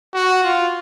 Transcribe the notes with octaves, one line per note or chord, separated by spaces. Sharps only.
F#4
F4